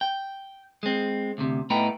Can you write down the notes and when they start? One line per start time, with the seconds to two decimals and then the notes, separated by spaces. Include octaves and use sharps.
0.01 G5
0.83 G#3 C4
1.38 D2 C3
1.70 A2 A3 B3 D#4 G5 A#5